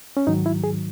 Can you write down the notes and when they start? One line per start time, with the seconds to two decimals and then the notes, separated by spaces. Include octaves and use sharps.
0.17 C#4
0.27 G#2 D#3 F#3 D#4
0.46 E4
0.64 G#4